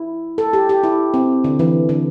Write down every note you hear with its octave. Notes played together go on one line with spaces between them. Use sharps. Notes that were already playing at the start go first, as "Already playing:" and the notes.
Already playing: E4
A4
G4
G4
E4
C4
D3
E3
D3